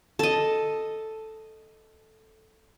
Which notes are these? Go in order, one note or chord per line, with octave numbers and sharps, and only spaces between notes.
A4 D#5